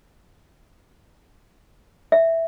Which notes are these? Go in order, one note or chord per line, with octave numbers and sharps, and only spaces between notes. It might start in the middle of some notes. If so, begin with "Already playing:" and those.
E5